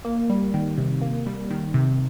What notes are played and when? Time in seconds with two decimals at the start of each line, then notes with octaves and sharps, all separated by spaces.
0.05 A#3
0.30 G3
0.54 D#3
0.78 C3
1.01 A#3
1.26 G3
1.50 D#3
1.74 C3